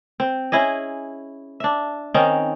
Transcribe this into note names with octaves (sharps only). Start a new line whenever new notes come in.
C4
C#4 E4 G#4 D#5
D4 E5
D#3 C4 C#4 D#4